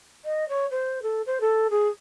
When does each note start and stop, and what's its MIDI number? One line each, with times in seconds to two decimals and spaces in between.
0.25 0.48 75
0.49 0.66 73
0.71 1.02 72
1.02 1.22 69
1.26 1.38 72
1.41 1.67 69
1.70 1.88 68